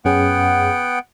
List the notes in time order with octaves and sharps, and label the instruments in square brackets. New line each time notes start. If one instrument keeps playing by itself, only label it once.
[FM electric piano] F#2 C#4 G#4 [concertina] B3 F#5 G5